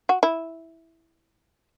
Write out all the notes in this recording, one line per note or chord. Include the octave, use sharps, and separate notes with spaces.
F#4
E4